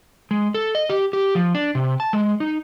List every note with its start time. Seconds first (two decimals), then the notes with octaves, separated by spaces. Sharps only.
0.31 G#3
0.54 A4
0.75 D#5
0.90 G4
1.13 G4
1.35 F3
1.55 D4
1.75 C3
2.00 A5
2.13 G#3
2.40 D#4